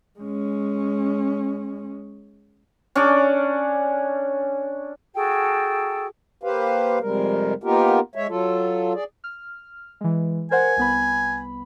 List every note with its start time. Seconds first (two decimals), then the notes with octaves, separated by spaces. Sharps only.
0.20 G#3 C#4
2.95 C#4 D4 D5
5.13 F#4 G#4 A4 G5
6.43 A#3 G4 B4 C5 F5
7.01 F2 C3 G3 G#3 A#4
7.63 A#3 B3 D#4 F4 G4 A#4
8.15 G#3 C#5 E5
8.29 F#3 F4 A4
8.94 G#4 D5
9.24 F6
10.01 E3 G#3
10.51 A#4 C5 F#5 G#5
10.77 C2 B3 B5